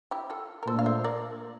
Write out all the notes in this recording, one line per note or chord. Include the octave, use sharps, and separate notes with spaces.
E4 G4
F4 A4
A#4
A#2 A3 D4 A4 C5
F5
C5 E5
A#4 D5